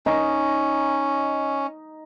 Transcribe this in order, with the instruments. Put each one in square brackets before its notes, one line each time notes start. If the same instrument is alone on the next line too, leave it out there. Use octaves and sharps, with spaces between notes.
[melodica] C#4 [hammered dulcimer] D#4